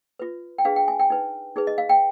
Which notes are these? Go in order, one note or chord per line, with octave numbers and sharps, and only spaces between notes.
F4 B4
G5
D4 G#4 B4 F5
G5
G#5
G5
D#4 B4
D#4 G#4 B4
D#5
F5
G5